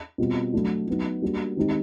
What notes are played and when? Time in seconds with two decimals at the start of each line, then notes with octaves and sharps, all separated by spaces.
0.18 B2 G3 C4 F4
0.54 F#3 A3 D4
0.87 F#3 B3 D#4
1.22 G3 A#3 D4 F#4
1.57 D#3 G#3 C4 D#4 G4